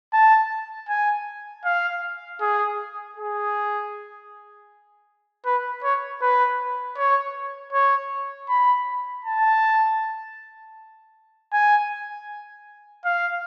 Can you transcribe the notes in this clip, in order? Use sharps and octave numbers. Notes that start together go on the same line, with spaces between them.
A5
G#5
F5
G#4
G#4
B4
C#5
B4
C#5
C#5
B5
A5
G#5
F5